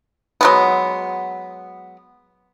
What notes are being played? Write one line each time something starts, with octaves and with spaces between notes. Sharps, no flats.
F#3 G#3 B3